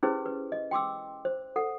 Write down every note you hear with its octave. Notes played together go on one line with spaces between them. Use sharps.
C#4 E4 G4 G#4 B4 C5
B4
D#5
G5 C6 D6 E6
C5
A4 F#5